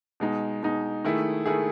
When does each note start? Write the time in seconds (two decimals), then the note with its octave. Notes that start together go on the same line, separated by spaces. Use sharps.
0.20 B2 G#3 D#4
0.63 B2 G#3 D#4
1.04 D#3 A3 E4 G#4
1.46 D#3 A3 E4 G#4